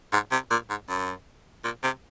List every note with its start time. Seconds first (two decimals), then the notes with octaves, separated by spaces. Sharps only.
0.12 G#2
0.31 C3
0.51 A#2
0.70 G#2
0.89 F#2
1.64 A#2
1.83 C3